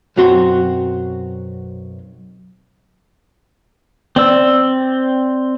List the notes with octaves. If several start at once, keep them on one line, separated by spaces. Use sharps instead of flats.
B1 F#2 F#3 C4 F#4 C6
C4 D5 E6